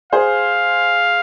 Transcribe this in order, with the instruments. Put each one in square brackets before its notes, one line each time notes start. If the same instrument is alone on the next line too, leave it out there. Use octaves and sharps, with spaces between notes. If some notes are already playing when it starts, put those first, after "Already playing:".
[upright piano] G#4 C5 [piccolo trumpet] F5